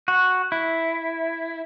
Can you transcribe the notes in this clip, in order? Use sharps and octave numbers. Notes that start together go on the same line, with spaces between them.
F#4
E4